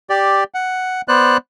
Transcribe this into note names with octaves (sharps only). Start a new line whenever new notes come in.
G4 D5
F#5
B3 C5 D5 F#6